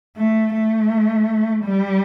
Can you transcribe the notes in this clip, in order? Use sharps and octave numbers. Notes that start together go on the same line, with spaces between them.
A3
A3
G3